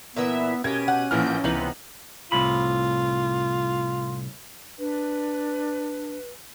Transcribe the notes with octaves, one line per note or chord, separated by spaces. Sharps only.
A#2 E3 B3 E4 E5
B2 C#4 G4 A#4 G#6 D#7
F#5
A#1 A2 E3 A#3 F6 G6
C#2 C3 E3 B3 D#4 F#7
C2 A2 F4 B5
D4 B4